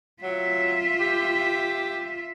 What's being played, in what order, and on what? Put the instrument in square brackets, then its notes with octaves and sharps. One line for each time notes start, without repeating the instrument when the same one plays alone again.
[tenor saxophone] F#3 [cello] F4 E5
[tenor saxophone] G4